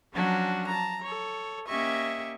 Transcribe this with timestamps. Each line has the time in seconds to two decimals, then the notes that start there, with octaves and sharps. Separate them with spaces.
0.13 F3 F#3 C#4 D4 F#4
0.67 A5 A#5
1.02 A4 C#5
1.67 A#3 C#4 G4 D#5 E5 C#6